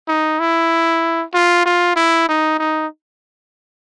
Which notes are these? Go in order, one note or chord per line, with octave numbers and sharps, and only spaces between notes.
D#4
E4
F4
F4
E4
D#4
D#4